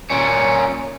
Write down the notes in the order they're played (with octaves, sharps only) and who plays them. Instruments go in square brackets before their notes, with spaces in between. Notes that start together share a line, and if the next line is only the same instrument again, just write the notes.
[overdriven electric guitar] A#2 C#4